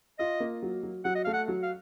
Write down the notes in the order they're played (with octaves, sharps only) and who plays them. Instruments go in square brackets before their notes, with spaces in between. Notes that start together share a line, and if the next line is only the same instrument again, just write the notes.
[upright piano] F4 [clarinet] D#5
[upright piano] A#3
F#3
F#3
[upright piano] F#3 [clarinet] F#5
[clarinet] D#5
[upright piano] A3 [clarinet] F5
[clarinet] F#5
[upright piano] F#3
[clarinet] F5